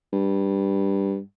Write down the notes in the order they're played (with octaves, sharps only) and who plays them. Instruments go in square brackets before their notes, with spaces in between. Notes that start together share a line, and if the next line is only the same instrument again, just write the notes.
[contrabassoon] G2